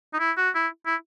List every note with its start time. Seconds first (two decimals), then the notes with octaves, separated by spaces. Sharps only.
0.13 D#4
0.19 E4
0.37 F#4
0.55 E4
0.86 E4